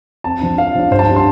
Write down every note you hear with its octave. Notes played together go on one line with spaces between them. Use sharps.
F2 A5
F3 D4
F2 F5
F3 D4
G2 C5
A5
G3 D4
C6